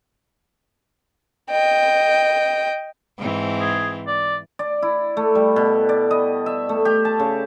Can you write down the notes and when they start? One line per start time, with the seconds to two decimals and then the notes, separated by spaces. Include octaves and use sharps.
1.50 D#5 G5
3.18 G#2 E3 C4
3.61 G#4
4.07 D5
4.59 D5
4.82 E4
5.17 A3
5.35 G3
5.56 B2
5.89 D5
6.11 D#5
6.46 E5
6.69 A3
6.85 G4
7.05 A5
7.20 C#3